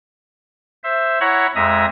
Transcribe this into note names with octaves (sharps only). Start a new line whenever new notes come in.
C5 E5
E4 C#5 F#5 A#5 B5 C#6
F2 G#3 E5 A#5 D#6